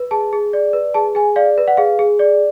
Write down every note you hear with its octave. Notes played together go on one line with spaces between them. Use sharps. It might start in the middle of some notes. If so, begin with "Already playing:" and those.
Already playing: B4
G#4 A5
G#4
D5
B4
G#4 A5
G#4 G#5
D5 F5
B4
F#5
G#4 F5
G#4
D5